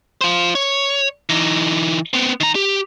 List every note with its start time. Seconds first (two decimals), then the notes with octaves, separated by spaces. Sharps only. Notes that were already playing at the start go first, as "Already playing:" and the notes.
0.21 F4 C5
0.55 C#5
1.29 E3 D#4
2.13 B3 C4
2.40 D#3 A#5
2.55 G4